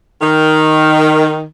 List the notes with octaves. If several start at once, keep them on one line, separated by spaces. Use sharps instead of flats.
D#3